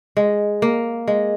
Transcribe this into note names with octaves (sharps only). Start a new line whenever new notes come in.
G#3
A#3
G#3